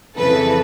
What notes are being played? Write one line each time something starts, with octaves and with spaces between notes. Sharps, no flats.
F2 C#3 E3 A4 B4